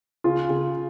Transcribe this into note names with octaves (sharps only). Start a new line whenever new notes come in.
C#3 F4
C#3